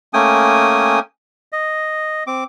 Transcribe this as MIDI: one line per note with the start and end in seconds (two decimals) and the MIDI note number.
0.14 1.00 57
0.14 1.00 58
0.14 1.00 61
0.14 1.00 79
0.14 1.00 80
0.14 1.00 87
1.52 2.24 75
2.27 2.44 60
2.27 2.44 86